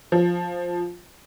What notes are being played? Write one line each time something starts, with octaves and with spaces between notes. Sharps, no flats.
F3